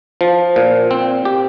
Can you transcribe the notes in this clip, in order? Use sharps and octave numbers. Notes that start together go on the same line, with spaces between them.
F3
A#2
C4
G4